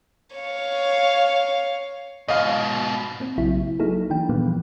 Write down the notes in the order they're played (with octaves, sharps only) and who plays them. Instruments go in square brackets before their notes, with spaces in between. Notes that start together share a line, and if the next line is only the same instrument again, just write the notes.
[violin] C#5 F5
[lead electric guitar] G#2 B2 [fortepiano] D#5 F5
[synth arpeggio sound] A#3 C4
B1 C#3 F#3 E4
F#3 A#3 D#4 E4 G#4 A4
D#3 E3 D4 G5
A#2 E3 F3 G3 A#3 B3